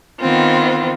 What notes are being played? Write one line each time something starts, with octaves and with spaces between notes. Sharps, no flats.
D#3 B3 C4 F4